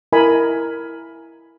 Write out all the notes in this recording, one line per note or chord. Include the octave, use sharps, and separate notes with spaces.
E4 A#4 D#5 G#5 B5